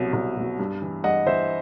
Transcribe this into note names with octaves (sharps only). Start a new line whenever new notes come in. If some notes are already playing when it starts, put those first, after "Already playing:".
Already playing: C2 B2 F#3
C2
B2 F#3
G2
E3
G2 D#5 F#5
E3 C5 E5